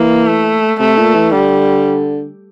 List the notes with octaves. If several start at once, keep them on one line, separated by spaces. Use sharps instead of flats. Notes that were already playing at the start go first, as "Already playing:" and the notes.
Already playing: E3 A#3
A3
C3 A3
A#2
E3
D3 G3